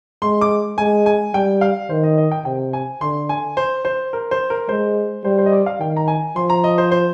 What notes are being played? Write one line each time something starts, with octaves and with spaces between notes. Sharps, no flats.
G#3 C6
D6
G#3 G#5
G#5
G3 G5
F5
D#3 C5
D#5
D#5
G5
C3 G5
G#5
D3 C6
G#5
C5
C5
A#4
C5
A#4
G#3 C5
G3 C5
C5
D#5
D5
F5
D#3 G5
A#5
G#5
F3 C6
A#5
D#5
C5
C5